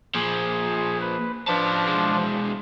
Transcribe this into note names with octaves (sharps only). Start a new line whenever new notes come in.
A#2 F3 G#4
B4
F3 D4 B4 A5
B2 G#3